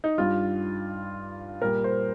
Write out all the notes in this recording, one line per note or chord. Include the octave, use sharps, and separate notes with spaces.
D#4
G2 G3 F4
A#2 G3 A#4
C5